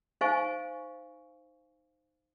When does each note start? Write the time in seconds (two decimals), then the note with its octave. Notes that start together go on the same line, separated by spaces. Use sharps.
0.21 D#4 C5 F5 G#5 C#6